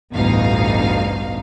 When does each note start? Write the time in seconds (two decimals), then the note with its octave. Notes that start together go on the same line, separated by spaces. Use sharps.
0.12 A1 D2 G2 B2 D#4 F5